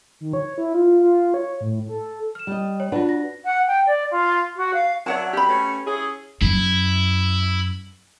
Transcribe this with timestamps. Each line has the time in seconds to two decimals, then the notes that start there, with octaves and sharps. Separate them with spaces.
0.20 D#3
0.33 C#5
0.58 E4
0.74 F4
1.00 F4
1.34 C#5
1.61 A2
1.89 A4
2.35 F6 E7
2.47 G3 D#5
2.80 C#5
2.92 D4 F4 F#4 B4 F#5
3.09 A#6
3.44 F#5
3.67 G5
3.86 D5
4.10 F4
4.56 F#4
4.73 F5
5.06 F#3 C#5 D5 E5 F#5 A5
5.33 G4 B5
5.49 A3 B3 C#4
5.86 C#4 E4 G#4
6.41 F#2 E4